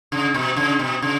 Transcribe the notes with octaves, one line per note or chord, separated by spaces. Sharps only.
C#3
B2
C#3
B2
C#3